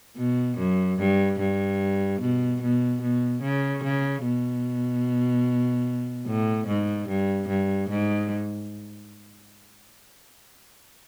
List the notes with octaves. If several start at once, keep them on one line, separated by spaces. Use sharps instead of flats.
B2
F#2
G2
G2
B2
B2
B2
C#3
C#3
B2
A2
G#2
G2
G2
G#2